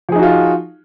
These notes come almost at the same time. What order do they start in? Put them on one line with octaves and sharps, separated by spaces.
F3 G#4 D#4 F#4 F4